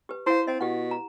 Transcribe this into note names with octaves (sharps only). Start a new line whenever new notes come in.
G4 B4
E4 C5 F5
C4 D#5
B2 G4 F#5
A#5